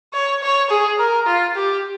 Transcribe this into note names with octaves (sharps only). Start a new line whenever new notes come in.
C#5
C#5
G#4
A#4
F4
G4